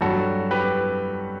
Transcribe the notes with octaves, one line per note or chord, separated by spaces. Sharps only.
G2 F#3 F#4 A4
G4 B4